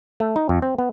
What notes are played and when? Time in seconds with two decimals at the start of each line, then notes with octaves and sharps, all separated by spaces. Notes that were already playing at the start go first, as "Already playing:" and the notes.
0.20 A3
0.36 D#4
0.49 F2
0.62 C4
0.78 B3